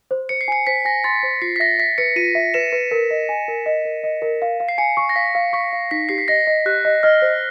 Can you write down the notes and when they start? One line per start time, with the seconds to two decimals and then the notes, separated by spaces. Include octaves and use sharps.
0.11 C5
0.29 C5 C#7
0.41 C7
0.48 G#5 C#7
0.67 C5 B6
0.85 G#5 A#6
1.04 C6 A6
1.23 C5
1.42 F4 C7
1.56 B6
1.60 E5 A#6
1.79 E5 B6
1.98 B4 C#7
2.16 F4 D#7
2.35 E5
2.54 B4 E7
2.72 B4
2.91 A#4
3.11 D#5
3.29 G#5
3.48 A#4
3.66 D#5
3.85 A#4
4.04 D#5
4.22 A#4
4.42 F5
4.60 F5
4.69 C7
4.78 G#5 C#7
4.97 C#6
5.09 A#6
5.16 F5 B6
5.35 F5
5.53 C#6 B6
5.73 F5
5.91 D#4 B6
6.09 G4 C7
6.18 B6
6.28 D#5 A#6
6.47 D#5
6.66 G4 F#6
6.85 D#5
7.03 D#5 F6
7.22 C5